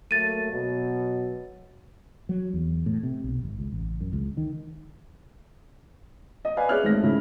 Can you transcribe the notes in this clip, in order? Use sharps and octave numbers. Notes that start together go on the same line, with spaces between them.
F#3 A3 A#3 A6 D#7
B2 F#3
F#3
E2
A2
C3
B1
G#1
C#2
A1
F#2
C#2
D#3
D#5
B4 D5 F5 G#5
G#4 C#5 D5 E5 F6 F#6
G#1 A3 A#6
G#2 C#3 E4